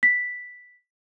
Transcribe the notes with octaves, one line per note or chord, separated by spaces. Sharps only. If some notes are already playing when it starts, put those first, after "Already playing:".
B6